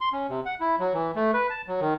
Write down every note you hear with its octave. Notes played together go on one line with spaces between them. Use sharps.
C6
C#4
C3
F#5
E4
F#3
E3
A3
B4
A5
F#3
D#3